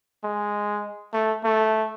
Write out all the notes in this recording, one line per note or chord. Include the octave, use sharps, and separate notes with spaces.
G#3
A3
A3